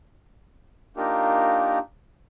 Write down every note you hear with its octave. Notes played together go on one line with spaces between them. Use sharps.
A#3 D4 D#4 F4 G4 A#4